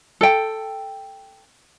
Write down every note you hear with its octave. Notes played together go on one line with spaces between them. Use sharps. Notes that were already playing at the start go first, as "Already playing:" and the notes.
A4 G5